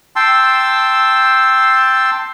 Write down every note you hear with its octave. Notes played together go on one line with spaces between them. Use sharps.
G5 A5 C6 E6